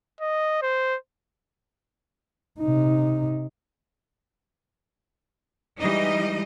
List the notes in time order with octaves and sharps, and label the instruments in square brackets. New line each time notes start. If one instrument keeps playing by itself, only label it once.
[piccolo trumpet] D#5
C5
[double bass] C3 D#4
[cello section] E3 G3 G#3 D#4 D#5